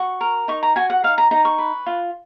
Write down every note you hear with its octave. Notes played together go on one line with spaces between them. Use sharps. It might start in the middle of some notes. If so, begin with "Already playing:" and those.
Already playing: F#4 C#6
A#4
D#4 C#6
A#5
F#4 G#5
F#5
D#4 F5
A#5
D#4 A#5
C#6
B4
F4